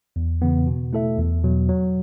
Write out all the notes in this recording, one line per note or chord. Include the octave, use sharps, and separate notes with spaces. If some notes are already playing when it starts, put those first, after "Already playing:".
E2
C#3 E3 B3
B2
A3 E4 A4 E5
E2
B2 F#3
F#3